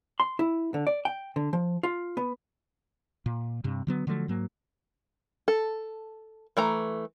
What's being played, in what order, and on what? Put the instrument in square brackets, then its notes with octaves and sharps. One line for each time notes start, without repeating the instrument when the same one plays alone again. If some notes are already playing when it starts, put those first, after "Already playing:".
[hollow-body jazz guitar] C6
E4
D3
D5
G5
D3
F3
F4
B3
[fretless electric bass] A#2
G2 C3
D3 F#3 B3
D3 F3 F#3 A3
G#2 F#3 A#3
[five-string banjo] A4
E3 A3 A#5